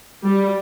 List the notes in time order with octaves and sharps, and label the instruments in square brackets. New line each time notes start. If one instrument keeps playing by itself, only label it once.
[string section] G3